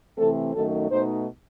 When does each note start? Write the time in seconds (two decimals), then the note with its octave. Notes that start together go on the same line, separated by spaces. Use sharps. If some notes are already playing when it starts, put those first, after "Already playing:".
0.17 C3 E3 A3 C4 A4
0.53 F#2 D#3 F#3 A3 D#4 A4
0.90 B2 A3 D#4 C5